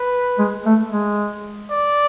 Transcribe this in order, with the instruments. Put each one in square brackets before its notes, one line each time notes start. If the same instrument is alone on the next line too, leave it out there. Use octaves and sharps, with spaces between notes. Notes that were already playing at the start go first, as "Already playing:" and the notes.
Already playing: [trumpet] B4
[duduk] G#3
A3
G#3
[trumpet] D5